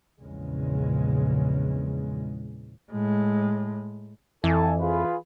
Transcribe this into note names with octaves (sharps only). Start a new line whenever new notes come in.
A#1 E2 C#3 G#3
A2 G#3
F2 E3 A4 G#5 A5
F4 G#4 B4